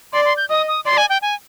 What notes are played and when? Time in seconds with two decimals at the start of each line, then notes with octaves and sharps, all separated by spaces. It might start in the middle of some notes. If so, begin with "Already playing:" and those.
0.13 D5 C6
0.25 C6
0.37 G6
0.49 D#5 D#6
0.68 D#6
0.85 D5 C6
0.97 G#5
1.09 G5
1.22 G#5